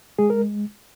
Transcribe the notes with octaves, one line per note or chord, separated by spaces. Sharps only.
G#3 G#4
A#4